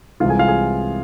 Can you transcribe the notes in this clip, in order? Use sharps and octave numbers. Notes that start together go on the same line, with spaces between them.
C2 C3 E3 G#3 F4 F5
G#4 G#5
F4 F5
G#4 G#5